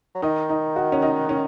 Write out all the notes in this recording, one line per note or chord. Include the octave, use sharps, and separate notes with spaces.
F#3
D#3 D#4
D#4
F#4
C#4
D#4
C#4